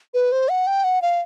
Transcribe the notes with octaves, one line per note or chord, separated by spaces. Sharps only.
B4
C5
F#5
G5
F#5
F5